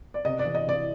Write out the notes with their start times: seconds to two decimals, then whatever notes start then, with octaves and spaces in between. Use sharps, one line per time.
0.14 D5
0.25 C3 D#5
0.39 D5
0.45 E3
0.55 D#5
0.64 C3 D5